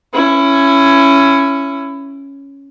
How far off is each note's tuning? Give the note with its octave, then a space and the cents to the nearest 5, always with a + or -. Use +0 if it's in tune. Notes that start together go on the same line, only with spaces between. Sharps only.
C#4 +0 E4 +20